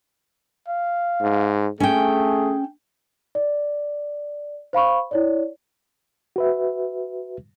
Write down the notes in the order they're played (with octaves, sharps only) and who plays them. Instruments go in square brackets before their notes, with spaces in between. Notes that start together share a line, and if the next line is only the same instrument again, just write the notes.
[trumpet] F5
[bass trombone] G#2
[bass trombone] A3 [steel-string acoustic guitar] C#4 G5 [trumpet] G#4
[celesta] D5
C5 F5 B5 C#6
E4 C#5 D5
[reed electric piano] F#4 B4 E5